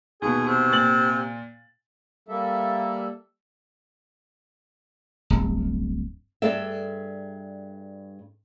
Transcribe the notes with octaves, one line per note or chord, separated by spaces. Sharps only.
D#2 B2 G#4
C3
A#2 A6 F#7
G3 A#3 A4 E5
D1 G1
G2 G#4 A4 D5 E5